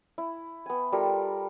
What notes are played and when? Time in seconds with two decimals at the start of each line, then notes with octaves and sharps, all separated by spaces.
0.18 E4
0.66 B3 G#5
0.92 G3 F4 A4 A#4